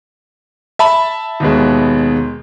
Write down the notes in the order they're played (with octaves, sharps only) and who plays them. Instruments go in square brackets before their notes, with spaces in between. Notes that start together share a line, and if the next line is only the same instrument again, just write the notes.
[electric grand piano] E5 A5 B5
[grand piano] D#2 B2 G#3